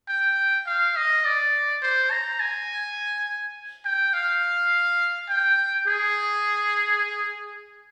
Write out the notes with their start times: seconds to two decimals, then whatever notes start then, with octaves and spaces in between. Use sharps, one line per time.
0.09 G5
0.67 F5
0.96 D#5
1.25 D5
1.82 C5
2.11 A#5
2.40 G#5
3.85 G5
4.14 F5
5.29 G5
5.87 G#4